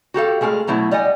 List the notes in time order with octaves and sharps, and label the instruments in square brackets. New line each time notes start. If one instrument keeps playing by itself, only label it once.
[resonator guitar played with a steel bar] F#4 G4 A4 F5
G#3 A3 G#4 A4 F5
B2 F#3 A3 B3 E4
G3 D5 D#5 F#5 G#5